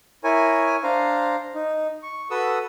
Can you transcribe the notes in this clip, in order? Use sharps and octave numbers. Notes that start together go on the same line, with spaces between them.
E4 A#4 C#5 G#5
D4 C5 F5 A#5
D#4
C#6
F#4 A4 B4 D#6 E6